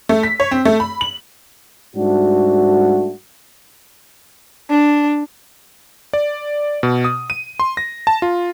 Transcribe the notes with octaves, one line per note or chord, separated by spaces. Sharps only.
A3
B6
C#5
C4
A3
B5
F#7
G#2 G3 A3 D4 F#4
D4
D5
B2
D#6
D#7
C6
A#6
A5
F4